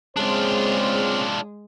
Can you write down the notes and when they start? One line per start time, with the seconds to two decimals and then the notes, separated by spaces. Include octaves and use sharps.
0.17 C#3 G#3 C4 D4 F4 C5